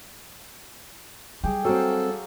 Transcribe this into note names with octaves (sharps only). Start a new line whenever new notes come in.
G3 G4 G#4
F#3 C4 F#4 A4 F5